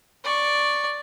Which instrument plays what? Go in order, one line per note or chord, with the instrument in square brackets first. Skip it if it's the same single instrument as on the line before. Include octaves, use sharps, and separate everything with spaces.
[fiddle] D5 C#6